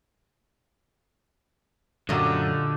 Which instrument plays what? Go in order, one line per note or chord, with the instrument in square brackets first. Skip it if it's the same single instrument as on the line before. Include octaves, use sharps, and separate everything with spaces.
[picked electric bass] F#2 F#3 [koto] A#2 D#5 [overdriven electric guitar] D3 [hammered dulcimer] A3 G4